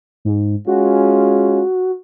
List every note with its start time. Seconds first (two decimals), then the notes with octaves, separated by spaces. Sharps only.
0.25 G#2
0.67 G#3 C#4 F4 F#4